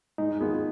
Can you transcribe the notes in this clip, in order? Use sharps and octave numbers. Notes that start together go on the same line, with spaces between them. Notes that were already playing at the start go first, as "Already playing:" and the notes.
G#2 D#4
D#3 B3 F4 G#4